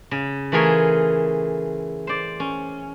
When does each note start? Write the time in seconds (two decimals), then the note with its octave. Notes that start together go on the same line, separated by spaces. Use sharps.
0.11 C#3
0.52 E3 A3 F4 G#4 A#4 C#5
2.07 C5 D5
2.40 C#4